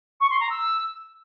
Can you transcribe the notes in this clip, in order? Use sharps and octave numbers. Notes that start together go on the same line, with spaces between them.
C#6
C6
A#5
E6